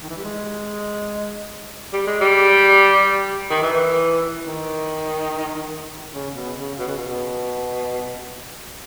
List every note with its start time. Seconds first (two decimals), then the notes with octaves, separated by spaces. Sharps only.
0.02 D#3
0.09 E3
0.16 G3
0.24 G#3
1.93 G3
2.07 G#3
2.21 G3
3.50 D#3
3.62 E3
4.46 D#3
6.15 C#3
6.36 B2
6.58 C#3
6.79 B2
6.88 C#3
6.98 B2